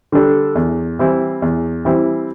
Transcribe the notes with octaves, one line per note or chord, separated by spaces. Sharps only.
D3 G3 D4 A4
E2
E3 G3 C4 E4
E2
E3 G3 C4 E4